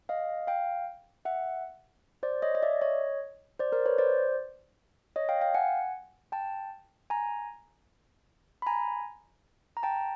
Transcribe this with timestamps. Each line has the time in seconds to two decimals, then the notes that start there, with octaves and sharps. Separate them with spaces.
0.09 D#5 F5
0.47 F5 G5
1.25 E5 F#5
2.23 C5 D5
2.42 C#5 D#5
2.55 D#5
2.62 D5 E5
2.81 C#5 D#5
3.59 C5 D5
3.72 A#4 C5
3.86 B4 C#5
3.98 C5 D5
5.16 C#5 D#5
5.29 F5 G5
5.41 F5 G5
5.54 F#5 G#5
6.32 G5 A5
7.10 G#5 A#5
8.62 B5
8.67 G#5 A#5
9.77 A#5
9.83 G5 A5